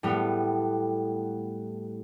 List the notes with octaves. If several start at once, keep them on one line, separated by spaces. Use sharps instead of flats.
A2 G3 B3